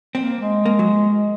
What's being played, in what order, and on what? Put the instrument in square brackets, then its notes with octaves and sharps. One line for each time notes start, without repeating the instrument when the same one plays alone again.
[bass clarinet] A#3 [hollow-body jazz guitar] C4
[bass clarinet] G#3
[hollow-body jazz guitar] A#3
F#3